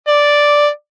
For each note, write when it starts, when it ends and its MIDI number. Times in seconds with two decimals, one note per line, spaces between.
0.08 0.68 74